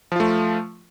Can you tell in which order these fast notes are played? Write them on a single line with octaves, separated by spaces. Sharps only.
F3 F4 A3